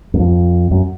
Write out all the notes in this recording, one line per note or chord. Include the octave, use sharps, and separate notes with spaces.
F#2
F2
F#2